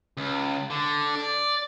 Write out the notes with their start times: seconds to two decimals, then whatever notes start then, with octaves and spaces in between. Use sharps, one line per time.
0.17 C#2
0.70 D3
1.15 D5